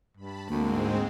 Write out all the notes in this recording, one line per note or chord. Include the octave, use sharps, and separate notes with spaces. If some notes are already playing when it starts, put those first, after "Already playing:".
G2 A5 B5
D2 G#2 G#3 A#3 C4